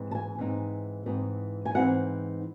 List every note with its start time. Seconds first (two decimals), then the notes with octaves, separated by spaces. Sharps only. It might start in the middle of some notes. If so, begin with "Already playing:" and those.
Already playing: G#2 E3 C4 D#4
0.11 A5
0.15 G#5
0.38 G#2 E3 C4 D#4
1.06 G#2 E3 C4 D#4
1.65 G#5
1.74 G#2 E3 C4 D#4 F#5